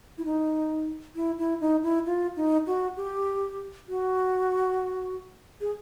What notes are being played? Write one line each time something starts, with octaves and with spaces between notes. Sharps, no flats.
E4
D#4
E4
E4
D#4
E4
F4
D#4
F#4
G4
F#4
G#4